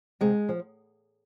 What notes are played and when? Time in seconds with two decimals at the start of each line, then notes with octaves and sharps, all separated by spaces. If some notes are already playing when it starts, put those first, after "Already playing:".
0.21 C3 G#3
0.49 F3